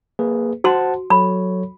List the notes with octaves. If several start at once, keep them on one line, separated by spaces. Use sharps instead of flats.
A#3 G#4 B4
F#4 C5 F#5 A5 C6
F#3 A4 C#5 B5